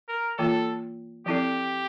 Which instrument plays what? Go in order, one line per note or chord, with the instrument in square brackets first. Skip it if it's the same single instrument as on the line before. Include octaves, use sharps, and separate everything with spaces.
[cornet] A#4
[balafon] E3 A#3 F4 [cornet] A4
[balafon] F3 C4 E4 A4 D5 [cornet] G4